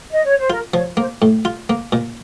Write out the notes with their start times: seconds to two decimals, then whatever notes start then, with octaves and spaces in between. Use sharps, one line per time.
0.10 D#5
0.23 C#5
0.37 C5
0.50 F4 A#4
0.74 F3 C#5
0.97 A#3 C5
1.22 A2
1.45 F4
1.69 A#3
1.92 A#2